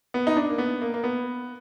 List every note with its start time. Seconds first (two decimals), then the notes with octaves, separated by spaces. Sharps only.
0.14 B3
0.27 D#4
0.37 D4
0.50 A#3
0.58 B3
0.81 A#3
0.94 A#3
1.04 B3